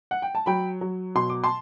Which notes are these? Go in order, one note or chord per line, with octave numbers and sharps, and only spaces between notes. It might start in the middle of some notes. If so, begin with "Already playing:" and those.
F#5
G5
A5
F#3 G5 B5
F#3
B2 C6
D6
A5 C6